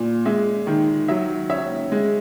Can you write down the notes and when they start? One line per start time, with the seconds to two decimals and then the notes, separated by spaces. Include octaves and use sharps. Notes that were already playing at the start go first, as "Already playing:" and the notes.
Already playing: A#2
0.25 G#3 E5
0.67 D#3
1.08 F#3 E5
1.50 C#4 E5
1.92 G#3